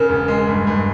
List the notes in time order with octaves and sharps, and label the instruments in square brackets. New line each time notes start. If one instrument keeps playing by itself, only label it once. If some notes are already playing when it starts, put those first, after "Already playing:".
Already playing: [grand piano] C#3 [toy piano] A#4
[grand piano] E1
G#3
G2
G2